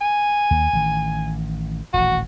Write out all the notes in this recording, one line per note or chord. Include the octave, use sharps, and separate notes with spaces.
G#5
D#2 A#3
A1 D#3
D#1 A1 F#4